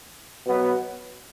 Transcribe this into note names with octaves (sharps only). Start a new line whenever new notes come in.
B2 F#3 B3